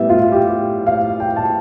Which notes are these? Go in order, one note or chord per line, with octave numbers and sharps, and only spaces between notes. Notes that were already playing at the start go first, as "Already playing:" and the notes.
Already playing: A2 G3 B3 E5
F4
G4
F5
G5
A5